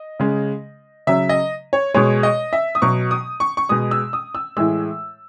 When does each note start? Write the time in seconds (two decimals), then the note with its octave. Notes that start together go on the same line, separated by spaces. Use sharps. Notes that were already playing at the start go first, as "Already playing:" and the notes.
Already playing: D#5
0.20 C#3 G#3
1.07 C#3 F#3 E5
1.29 D#5
1.73 C#5
1.94 B2 G#3 C#5
2.23 D#5
2.53 E5
2.75 D#6
2.82 B2 F#3 C#6
3.11 D#6
3.40 C#6
3.57 C#6
3.69 B2 G#3 D#6
3.91 E6
4.13 D#6
4.35 E6
4.57 A2 E3 G#3 E6